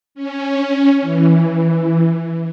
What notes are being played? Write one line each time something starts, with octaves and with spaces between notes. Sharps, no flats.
C#4
E3